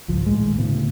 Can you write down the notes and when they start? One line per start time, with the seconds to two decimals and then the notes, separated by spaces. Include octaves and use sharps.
0.08 G#1 C#2 F3
0.26 A#1 D#2 A2 G#3
0.58 D2 A2 C#3 B3